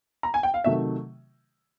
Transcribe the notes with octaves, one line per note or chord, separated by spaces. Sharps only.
A#5
G#5
G5
F5
C3 D#3 F#3 A3 E5